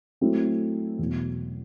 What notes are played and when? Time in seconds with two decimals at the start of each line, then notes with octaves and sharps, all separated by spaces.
0.21 F#3 A3 C4 E4
0.99 E2 B2 F#3